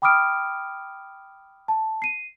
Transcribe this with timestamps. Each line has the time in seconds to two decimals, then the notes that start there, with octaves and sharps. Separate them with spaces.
0.02 G5 B5 D6 D#6 F6 D7
1.68 A5
2.02 C7 D#7